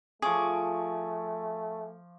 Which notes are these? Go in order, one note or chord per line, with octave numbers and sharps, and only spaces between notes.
F3 A3 G#4 C#6 D6